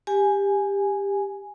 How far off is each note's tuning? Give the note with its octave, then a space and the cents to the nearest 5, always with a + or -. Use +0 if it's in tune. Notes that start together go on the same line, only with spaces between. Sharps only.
G4 +15 G#5 +0